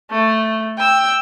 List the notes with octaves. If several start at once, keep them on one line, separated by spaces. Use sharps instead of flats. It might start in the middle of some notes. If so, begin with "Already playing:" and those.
A3
G5 E6